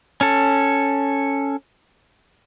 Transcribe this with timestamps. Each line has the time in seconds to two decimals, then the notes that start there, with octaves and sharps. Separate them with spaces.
0.21 C#4 A4